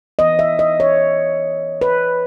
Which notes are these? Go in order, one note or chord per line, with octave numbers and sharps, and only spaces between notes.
E3 B3 D#5
E5
D#5
C#5
B4